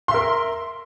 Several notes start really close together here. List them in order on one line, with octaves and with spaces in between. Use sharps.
C6 E5 A#4